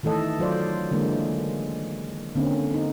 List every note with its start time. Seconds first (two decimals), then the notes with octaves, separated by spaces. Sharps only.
0.03 D#3 E3 A3 A4 D#5
0.39 F#3 F4 C5 D5
0.91 D3 E3 G#3 A#3
2.35 D3 A#3 C4 C#4
2.74 D#4